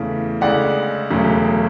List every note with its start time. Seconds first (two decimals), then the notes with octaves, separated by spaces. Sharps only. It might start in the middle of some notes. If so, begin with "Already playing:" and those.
Already playing: E2 C#3 E3 A3
0.41 D2 C#3 G#3 D5 F#5
1.10 E1 D2 C#3 F#3 A3